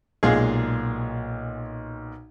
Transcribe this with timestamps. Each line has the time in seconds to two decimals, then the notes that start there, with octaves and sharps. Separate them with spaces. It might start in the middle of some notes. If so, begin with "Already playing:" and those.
0.23 B1 A#2 G#3 F4 G#4